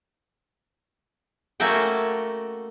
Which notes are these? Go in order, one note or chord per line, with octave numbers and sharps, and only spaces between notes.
A3 A#3 C#4 F#4 A4 G5